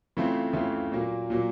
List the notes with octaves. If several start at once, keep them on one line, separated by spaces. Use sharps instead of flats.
C#3 E3 A3 C4 F4
C#3 E3 A3 C4 F4
A#2 F#3 A#3
A#2 F#3 A#3